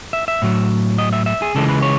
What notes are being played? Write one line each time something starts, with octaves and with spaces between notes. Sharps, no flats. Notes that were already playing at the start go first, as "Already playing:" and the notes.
E5
E5
A2 F#3
D#5
E5
E5
G#4
C#2 C#3 E3 G#3 A4
B4
C#5